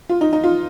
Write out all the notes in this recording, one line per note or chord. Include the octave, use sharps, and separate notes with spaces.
F4
D#4
D#4
F4